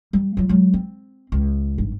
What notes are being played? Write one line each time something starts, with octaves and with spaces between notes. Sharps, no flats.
G3
F#3 F4
F#3 G#3
C4
C#2
G#1 G2